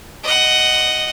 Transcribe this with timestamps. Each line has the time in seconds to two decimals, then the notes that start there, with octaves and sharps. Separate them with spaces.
0.24 D#5 F#5